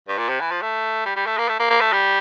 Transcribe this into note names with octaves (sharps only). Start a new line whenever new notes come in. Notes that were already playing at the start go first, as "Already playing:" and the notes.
G2
A#2
C3
E3
F3
A3
G3
G3
A3
A#3
A3
A#3
A#3
A3
G3